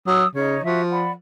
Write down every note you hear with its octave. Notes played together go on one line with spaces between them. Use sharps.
F#3 D#6 E6
C#3 D#4 C#5 C#6
F3 F#4 E5 C#6
D5 F#5 B5